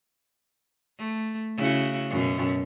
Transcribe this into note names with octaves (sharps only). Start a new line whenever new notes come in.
A3
C#3 E4 F#4
F#2 B2